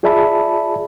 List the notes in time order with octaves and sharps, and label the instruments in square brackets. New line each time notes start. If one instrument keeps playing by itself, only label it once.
[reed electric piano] F4 G#4 D5 E5 A5 B5